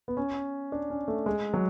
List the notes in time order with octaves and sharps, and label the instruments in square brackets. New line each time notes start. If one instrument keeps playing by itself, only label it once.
[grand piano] B3
C#4
D4
C#4
A3
G#3
F#3